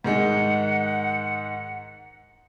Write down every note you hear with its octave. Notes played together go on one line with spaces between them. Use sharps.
G#2 D#3 G#3 F#5